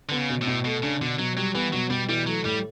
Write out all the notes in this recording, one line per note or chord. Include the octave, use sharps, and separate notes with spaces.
D3 B3
C#3
B2
A2
B2
B2 A3
C#3 D4
B2 D3
B2 F#3
F#3 G3
E3 B3
B2 F#3
B2 G3
E3 G3
F#3 A3
A2 G3